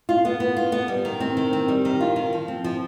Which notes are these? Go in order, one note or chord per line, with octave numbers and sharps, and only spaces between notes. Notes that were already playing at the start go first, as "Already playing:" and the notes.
F4
B3
B3
F4
B3
G3
D#3
C4
D#3
C4
G3
D#3
F4
D#3
F3
C4
F3